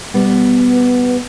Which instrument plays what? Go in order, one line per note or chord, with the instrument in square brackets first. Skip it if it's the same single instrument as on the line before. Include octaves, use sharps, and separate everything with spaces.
[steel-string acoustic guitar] B2 G3 B3